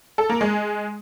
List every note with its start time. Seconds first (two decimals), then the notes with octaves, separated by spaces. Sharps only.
0.18 A4
0.29 A#3
0.41 G#3